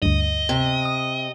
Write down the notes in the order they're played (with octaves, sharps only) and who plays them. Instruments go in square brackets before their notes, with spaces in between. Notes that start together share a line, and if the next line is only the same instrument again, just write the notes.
[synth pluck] D2 G2 [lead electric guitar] D#5
[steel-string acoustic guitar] C3
[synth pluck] D#6